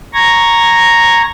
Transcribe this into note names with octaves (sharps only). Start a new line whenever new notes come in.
A#5 C#6 G#6 A#6